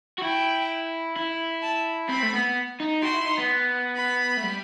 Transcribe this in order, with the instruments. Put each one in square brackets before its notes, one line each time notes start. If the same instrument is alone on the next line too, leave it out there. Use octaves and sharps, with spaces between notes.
[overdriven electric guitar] F#4
[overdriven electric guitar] E4 [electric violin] G5
[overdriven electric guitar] E4
[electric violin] A5
[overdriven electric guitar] C4 [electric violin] B5
[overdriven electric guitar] A3
B3
D#4
[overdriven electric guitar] F#4 [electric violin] C6
[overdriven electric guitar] E4
D#4
B3
[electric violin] B5
[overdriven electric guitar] A3
G3